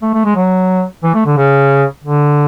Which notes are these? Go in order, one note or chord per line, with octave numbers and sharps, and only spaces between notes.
A3
A3
G#3
F#3
E3
A3
D3
C#3
D3